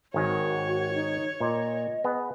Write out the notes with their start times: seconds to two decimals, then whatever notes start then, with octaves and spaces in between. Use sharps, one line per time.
0.14 G#1 D#3 F#4 C#5 G#5
0.94 D#4
1.40 A#2 D#5
2.04 B3 G#4